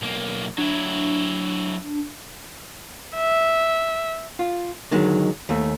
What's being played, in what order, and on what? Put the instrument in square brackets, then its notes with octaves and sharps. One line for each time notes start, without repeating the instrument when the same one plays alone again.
[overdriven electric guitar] B1 A#3
[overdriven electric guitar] F#3 E4 [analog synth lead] D4
[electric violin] E5
[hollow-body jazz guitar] F4
D3 D#3 F#3 G#3
D#2 A3